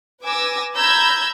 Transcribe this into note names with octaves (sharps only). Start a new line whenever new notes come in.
B4 G#5 D6 E6 A#6
A#5 B5 E6 G6 G#6